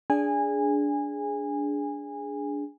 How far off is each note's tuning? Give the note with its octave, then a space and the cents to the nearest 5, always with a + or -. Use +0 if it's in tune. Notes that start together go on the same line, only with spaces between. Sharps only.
D4 -15 G#4 +0 G#5 -20